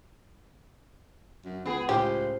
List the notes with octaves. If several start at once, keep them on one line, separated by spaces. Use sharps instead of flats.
F#2
C#2 B3 G#4
C#2 A2 G4 C5 F5 G#5